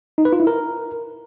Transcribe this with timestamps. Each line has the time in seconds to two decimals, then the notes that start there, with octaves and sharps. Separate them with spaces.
0.18 D#4
0.25 B4
0.33 F4
0.40 E4
0.47 A#4